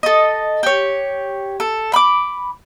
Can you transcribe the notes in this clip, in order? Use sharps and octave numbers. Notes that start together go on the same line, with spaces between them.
A4 D#5
G4 C#5
A4
B5 D6